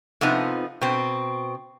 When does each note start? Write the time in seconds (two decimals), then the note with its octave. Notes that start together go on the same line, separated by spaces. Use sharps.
0.21 F2 C3 F3 B3 D#4
0.81 B2 C4